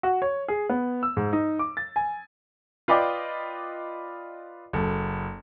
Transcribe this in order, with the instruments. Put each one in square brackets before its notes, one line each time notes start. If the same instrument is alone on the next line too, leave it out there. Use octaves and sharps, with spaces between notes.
[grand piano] F#4
C#5
G#4
B3
E6
G#2
D#4
D6
A6
G#5
F4 B4 D5 D#5 G5 D6
F#1 A4